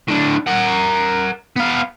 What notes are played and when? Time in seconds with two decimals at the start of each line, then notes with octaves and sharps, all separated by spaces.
0.08 A2 D4
0.47 A#4 F#5
1.56 B3 F5